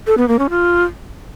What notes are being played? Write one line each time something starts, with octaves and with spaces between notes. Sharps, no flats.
A4
B3
A#3
C#4
F4